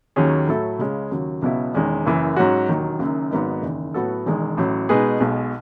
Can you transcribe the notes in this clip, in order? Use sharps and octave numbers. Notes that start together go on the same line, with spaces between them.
D#2 D#3 F#3 C#4 G#4
A2 F#3 A3 E4 A4
C#2 C#3 G#3 C#4 G#4
D#2 C#3 F#3
C#2 B2 F#3 B3 E4
E1 E2 D#3 G#3 C#4
F#1 F#2 E3
G#2 F#3 C#4 F#4
E1 D#2 D#3 F#3
F#1 F#2 D#3
G#1 G#2 F#3 B3 D#4
F#1 E2 D#3
A2 F#3 B3 F#4 A4
E1 E2 D#3 G#3
A1 A2 F#3
B2 G#3 D#4 G#4 B4
B1 B2 G#3